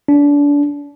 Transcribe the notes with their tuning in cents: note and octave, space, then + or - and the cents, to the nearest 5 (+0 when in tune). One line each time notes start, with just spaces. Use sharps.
D4 -30